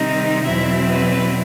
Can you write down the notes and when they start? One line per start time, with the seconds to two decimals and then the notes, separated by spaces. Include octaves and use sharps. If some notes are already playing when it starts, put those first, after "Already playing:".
Already playing: C3 D#3 G3 C4 D#4
0.45 E2 B2 F#3 C4 E4 E5
0.90 B4